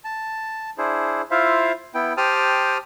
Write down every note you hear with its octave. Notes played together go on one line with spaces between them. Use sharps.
A5
D4 E4 G#4 C5
E4 F4 C5 E5 F5
B3 E4 G5
G4 C5 G5 A5 D#6 F6